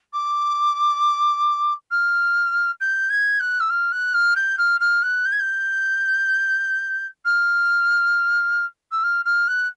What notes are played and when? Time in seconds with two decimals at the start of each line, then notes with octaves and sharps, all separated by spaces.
0.13 D6
1.91 F6
2.81 G6
3.10 G#6
3.40 F#6
3.60 E6
3.70 F6
3.92 F#6
4.14 F6
4.36 G6
4.58 F6
4.80 F6
5.03 F#6
5.25 G6
5.32 G#6
5.40 G6
7.25 F6
8.92 E6
9.03 F6
9.25 F6
9.48 F#6